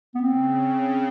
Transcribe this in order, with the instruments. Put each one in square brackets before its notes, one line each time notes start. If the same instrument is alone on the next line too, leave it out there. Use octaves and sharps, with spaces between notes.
[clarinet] B3
[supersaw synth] C#3 [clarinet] C4